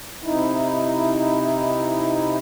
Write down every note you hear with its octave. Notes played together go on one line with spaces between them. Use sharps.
C3 D#4 E4